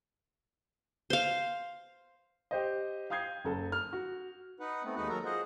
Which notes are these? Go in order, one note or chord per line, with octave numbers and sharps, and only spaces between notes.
C5 F5
G4 C5 D#5
F5 G5 D#6 G6 G#6 C7
F#1 A4 A5
F6
F#4
D#4 B4 F#5
A3 B3 C4
D#2 G#3 D#4 F#4 B4 F#5
F#3 F#4 A4 A#4 A#5
F4 G#4 C5 D#5 F#5